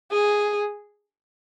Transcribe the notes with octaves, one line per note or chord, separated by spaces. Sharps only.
G#4